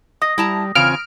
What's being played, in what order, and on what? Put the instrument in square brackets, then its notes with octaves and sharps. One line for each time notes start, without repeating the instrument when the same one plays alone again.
[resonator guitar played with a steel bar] D#5 [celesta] D#6 A#6
[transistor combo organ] G3 [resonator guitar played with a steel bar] E4 A5 A#5
[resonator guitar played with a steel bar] E2 C#3 [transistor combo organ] C4 F4 G#5 [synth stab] F6 D7